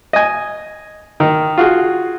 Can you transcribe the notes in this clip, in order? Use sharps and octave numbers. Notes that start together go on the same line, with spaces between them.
D#5 G#5
D#3
F4 F#4 G#4